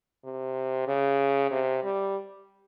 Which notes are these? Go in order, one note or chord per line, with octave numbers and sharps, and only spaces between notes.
C3
C#3
C3
G3